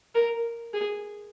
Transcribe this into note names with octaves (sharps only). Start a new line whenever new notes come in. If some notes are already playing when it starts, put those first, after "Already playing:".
A#4
G#4